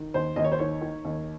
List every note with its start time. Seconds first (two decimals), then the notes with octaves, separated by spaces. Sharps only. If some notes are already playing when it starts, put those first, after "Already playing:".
Already playing: D#3
0.14 D#2 C5
0.36 D#2 D#5
0.44 C#5
0.52 C5
0.59 D#3 C#5
0.81 D#3
1.05 D#2